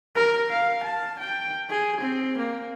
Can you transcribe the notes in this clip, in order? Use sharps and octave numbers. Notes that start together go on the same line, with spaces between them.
A#4
F5
A5
G5
G#4
C4
A#3